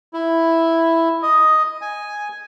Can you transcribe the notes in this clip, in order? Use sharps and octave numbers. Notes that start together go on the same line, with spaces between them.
E4
D#5
G#5